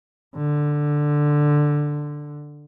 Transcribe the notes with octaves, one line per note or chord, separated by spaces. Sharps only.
D3